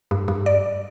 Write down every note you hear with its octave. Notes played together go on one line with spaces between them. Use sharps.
G2
G2
D5